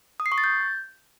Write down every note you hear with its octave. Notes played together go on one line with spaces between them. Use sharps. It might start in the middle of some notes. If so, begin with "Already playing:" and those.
D#6
C7
C#6
A6
G6